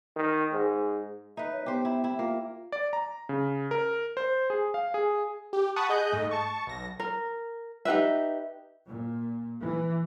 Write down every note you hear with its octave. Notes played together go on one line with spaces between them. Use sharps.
D#3
G#2
D#4 B4 E5
C#5
B3 G4 C5
E4
E4
A#3 F4
D5
A#5
C#3
A#4
C5
G#4
F5
G#4
G4
F#5 A5 B5 C#6 D#6 F#6
G#4 D#5 F#6 G6
G#2 A3 D#5
A5 C#6
B1 A#6
A#4
D#4 G4 B4 E5
A#2
E3